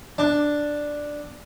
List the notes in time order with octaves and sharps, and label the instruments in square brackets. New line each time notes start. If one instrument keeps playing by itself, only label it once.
[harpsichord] D4